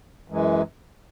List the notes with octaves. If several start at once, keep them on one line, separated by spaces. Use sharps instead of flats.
F#2 E3 G#3